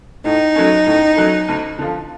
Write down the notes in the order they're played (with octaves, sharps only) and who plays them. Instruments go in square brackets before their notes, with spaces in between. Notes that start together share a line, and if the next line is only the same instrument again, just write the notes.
[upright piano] A2 [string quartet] D#4
[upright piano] F#3 A3 C#4
A2
F#3 A3 C#4
D2
D3 F3